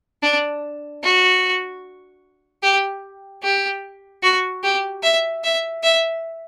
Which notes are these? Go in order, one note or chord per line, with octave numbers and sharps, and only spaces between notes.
D4
F#4
G4
G4
F#4
G4
E5
E5
E5